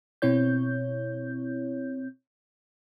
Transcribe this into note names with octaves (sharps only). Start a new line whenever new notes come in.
B2 C4 E4 C#5 G6